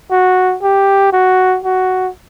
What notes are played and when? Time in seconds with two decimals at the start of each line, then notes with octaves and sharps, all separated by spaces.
0.11 F#4
0.63 G4
1.12 F#4
1.64 F#4